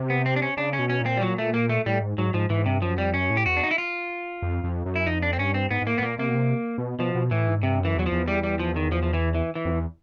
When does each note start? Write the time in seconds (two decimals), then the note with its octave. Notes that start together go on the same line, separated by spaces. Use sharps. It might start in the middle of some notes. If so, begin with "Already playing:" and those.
Already playing: C3
0.10 B3
0.26 C4
0.36 D4
0.42 C#4
0.57 C#3 D4
0.73 C#4
0.79 B2
0.89 C#4
1.01 A#2 C4
1.17 G3
1.22 F#3
1.38 A3
1.54 A#3
1.69 A3
1.86 A2 G3
2.02 G#2
2.18 G#2 F#3
2.34 G#2 F3
2.50 G#2 E3
2.66 G2 C3
2.82 F#2 F3
2.98 F2 G3
3.14 F#2 C#4
3.30 A2
3.37 G4
3.46 E2 F#4
3.57 D4
3.63 D#4
3.71 E4
3.78 F4
4.42 F2
4.64 F2
4.86 F#2
4.96 E4
5.06 F2 D#4
5.22 D4
5.33 C4
5.38 G2 C#4
5.54 C4
5.71 G#2 B3
5.82 G#2
5.87 A2 A#3
5.98 A2 B3
6.02 A#2 A#3
6.18 C3 A#3
6.29 B2
6.35 C3
6.78 B2
6.99 B2 F3
7.15 B2
7.31 A2 E3
7.47 G#2
7.63 G2 C3
7.79 F#2
7.85 E3
7.96 E2 F#3
8.06 F3
8.12 E2
8.28 G3
8.43 G3
8.59 F3
8.76 D#3
8.92 F3
9.03 F3
9.13 E3
9.35 E3
9.55 E3
9.65 F2
9.72 E2